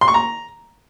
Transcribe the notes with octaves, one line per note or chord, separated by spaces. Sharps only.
C6
C#6
A#5